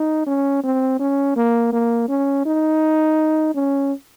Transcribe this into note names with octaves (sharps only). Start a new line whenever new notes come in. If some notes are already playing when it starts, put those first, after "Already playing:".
Already playing: D#4
C#4
C4
C#4
A#3
A#3
C#4
D#4
C#4